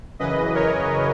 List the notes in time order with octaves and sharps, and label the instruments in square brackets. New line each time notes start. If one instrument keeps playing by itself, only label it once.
[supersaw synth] F#2 C#3 E3 B4 D#5
A#4 C#5